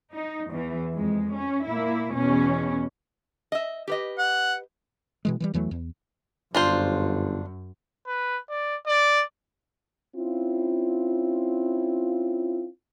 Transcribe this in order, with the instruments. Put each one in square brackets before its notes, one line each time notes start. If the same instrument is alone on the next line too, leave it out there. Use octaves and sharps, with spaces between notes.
[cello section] D#4
E2 E3
F2 G#3
C#4
A#2 A#3 E4
E2 B2 C#4
[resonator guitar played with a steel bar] D#5 E5
G4 B4 D#5
[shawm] F#5
[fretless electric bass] B2 E3 G#3
E3 F3 G3
E2 E3 F#3 A3
E2
[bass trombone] G1 [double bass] F#2 [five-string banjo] D4 F4 C5
[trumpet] B4
D5
D5
[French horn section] C4 C#4 E4 F4